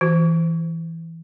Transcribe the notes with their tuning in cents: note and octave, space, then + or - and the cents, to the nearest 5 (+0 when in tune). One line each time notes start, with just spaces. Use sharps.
E3 +0 F#4 +0 C5 -10